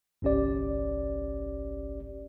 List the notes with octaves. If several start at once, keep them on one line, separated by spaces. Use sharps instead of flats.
G1 C2 C#4 G4 D5